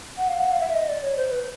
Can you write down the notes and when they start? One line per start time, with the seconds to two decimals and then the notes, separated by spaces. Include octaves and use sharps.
0.17 F#5
0.28 F5
0.39 F#5
0.52 F5
0.60 E5
0.74 D#5
0.89 D5
1.03 C#5
1.17 C5
1.31 B4